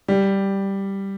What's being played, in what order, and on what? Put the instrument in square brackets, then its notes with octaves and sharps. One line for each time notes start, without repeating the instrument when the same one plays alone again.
[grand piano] G3